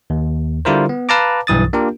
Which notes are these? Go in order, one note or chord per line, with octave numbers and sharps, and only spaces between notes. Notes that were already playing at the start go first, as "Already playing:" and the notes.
D#2
D3 G3 E4 F4 A#4 C5
B3
B4 F5 A5 A#5 D6
B1 G2 E3 D#6 A6
A#3 D4 F4 G4 A#4